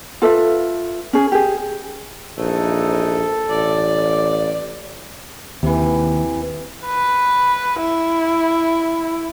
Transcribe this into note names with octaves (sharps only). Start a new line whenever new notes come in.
F4 A4 B4 E5
C#4 G#4
G4 G#4
A#1 E3 A3 D#4 A4
A1 D5
D#2 C3 E3
B4
E4